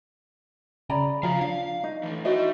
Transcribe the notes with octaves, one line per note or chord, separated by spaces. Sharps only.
C#3 D5 A#5 B5
F3 F4 C#5 F5 A#5
D4 F5
D#4
E3 A3
D#4 E4 F#4 C5 D#5